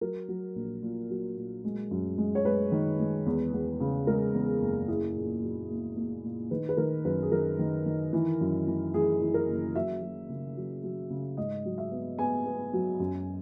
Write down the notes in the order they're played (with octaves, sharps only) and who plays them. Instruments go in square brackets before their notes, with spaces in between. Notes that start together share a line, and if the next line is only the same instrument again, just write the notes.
[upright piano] F#3 A#4
F#3
A#1
A#2
F#3
A#2
G#3
F#2
G#3
C#5
G#3 B4
D#3
G#3
E2
E2
C#3
G#3 A#4
E2
F#1
E4 G#4
A#2
F#3
A#3
A#3
A#2
D#3 B4
B4
D#3 A#4
F#2 B4
G#4
D#3 A#4
D#3
D#3
E3
F#2
E3
E3 G#4
E3
A#4
F#1
F#3 E5
F#3
C#3
F#3
F#3
C#3
G#2 D#5
F#3
E5
B3
B3 G#5
B3
F#3
F#2